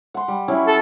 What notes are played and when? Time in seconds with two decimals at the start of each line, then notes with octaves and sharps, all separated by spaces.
0.14 F#5 C6
0.28 G3
0.48 F#3 C#4 E4
0.68 A4